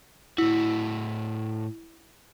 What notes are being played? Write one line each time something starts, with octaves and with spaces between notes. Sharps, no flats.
A2 E4 F#4